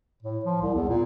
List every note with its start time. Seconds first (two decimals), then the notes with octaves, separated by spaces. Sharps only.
0.23 A2
0.45 F3
0.61 C2
0.75 E2
0.89 A#2